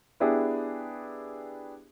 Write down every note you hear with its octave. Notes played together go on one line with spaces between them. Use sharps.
B3 D4 E4 G4 G#4